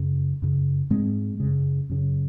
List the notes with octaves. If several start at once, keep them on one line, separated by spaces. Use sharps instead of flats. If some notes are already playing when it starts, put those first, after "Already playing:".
Already playing: F#2 C#3
F#2 C#3
G#2 G#3 C4
F#2 C#3
F#2 C#3